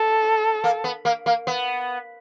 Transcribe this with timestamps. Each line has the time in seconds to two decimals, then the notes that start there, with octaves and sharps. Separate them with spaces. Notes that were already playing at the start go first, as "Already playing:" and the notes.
Already playing: A4
0.64 A#3
0.84 B3
1.05 A#3
1.26 A#3
1.47 B3